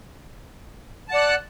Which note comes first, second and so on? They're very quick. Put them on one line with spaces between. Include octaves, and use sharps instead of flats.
A5 F#5 D5 F#6